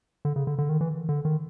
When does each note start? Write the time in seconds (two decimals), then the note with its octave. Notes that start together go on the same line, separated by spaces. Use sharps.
0.25 D3
0.36 C#3
0.47 D3
0.58 D3
0.69 D#3
0.81 E3
1.09 D3
1.25 D#3